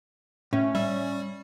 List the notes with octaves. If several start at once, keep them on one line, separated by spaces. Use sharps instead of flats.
A2 C#4
G3 E5